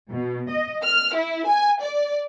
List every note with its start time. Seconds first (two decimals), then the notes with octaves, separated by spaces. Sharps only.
0.11 B2
0.50 D#5
0.84 F6
1.15 E4
1.47 G#5
1.83 D5